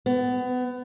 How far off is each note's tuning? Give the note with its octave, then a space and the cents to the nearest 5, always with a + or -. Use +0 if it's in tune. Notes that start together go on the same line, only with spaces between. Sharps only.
B3 +25